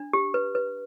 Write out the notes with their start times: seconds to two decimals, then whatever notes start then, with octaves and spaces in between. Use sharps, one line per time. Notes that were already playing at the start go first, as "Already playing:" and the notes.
Already playing: D4
0.13 G4
0.34 B4
0.55 B4